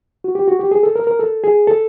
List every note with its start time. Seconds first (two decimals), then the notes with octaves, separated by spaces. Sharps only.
0.24 F#4
0.35 G4
0.48 F#4
0.60 G4
0.71 G#4
0.83 A4
0.96 A#4
1.07 A#4
1.19 A4
1.44 G#4
1.67 A4